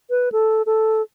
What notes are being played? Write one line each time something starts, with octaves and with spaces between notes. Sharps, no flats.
B4
A4
A4